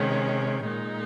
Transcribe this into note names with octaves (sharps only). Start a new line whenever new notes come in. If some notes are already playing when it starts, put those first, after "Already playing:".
Already playing: C3 D#3 G#3 C#4
A#2 G#3 D#4